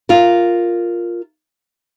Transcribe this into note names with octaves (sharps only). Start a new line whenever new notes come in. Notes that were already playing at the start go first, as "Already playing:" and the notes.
F4 A#4